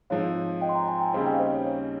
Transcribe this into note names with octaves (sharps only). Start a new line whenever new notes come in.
G#2 F3 C4 C#5 F5
D#5 G5
C6
G5 A#5
G#5 C6
G5 A#5
D#2 C#3 G3 C4 D#4 F5 G#5
D#5 G5
F5
C5 D#5
C#5
C#5